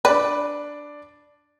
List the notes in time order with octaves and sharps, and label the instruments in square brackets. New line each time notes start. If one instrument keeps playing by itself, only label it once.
[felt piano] D4 D5 [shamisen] B4